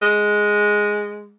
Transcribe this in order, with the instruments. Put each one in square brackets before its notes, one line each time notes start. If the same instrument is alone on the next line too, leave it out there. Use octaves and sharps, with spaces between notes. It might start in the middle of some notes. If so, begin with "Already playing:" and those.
[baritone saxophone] G#3